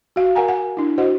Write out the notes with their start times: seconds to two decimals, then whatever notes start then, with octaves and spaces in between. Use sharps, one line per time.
0.16 F#4 F5
0.35 A#4 F#5 G#5 A#5
0.49 F#5
0.77 D4 E4
0.98 F#4 C5 D#5 F#5